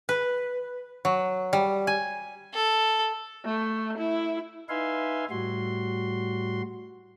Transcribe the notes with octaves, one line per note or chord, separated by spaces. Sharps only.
B4
F#3
G3
G#5
A4
A3
E4
D#4 B4 E5 F5 G#5 C6
A2 G3 F#4 C6